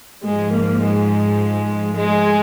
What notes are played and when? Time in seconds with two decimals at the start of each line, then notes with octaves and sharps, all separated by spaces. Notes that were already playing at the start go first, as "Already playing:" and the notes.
0.25 G#2 F3 G#3
0.53 A#3
0.82 G#3
1.96 G#3